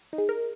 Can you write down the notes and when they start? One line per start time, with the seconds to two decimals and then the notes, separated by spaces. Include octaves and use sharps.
0.13 D#4
0.18 G#4
0.29 A#4